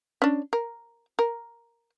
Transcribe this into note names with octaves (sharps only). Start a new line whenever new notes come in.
C#4 D4
A#4
A#4